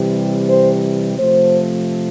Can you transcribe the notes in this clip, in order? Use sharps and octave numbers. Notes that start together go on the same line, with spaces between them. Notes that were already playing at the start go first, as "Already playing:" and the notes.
Already playing: C3 E3 G3
C5
C3 F3 A3 C5